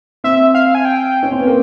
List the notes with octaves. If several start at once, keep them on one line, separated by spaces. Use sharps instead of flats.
C4 E5
F5
G#5
G5
C#4
C4
B3
A#3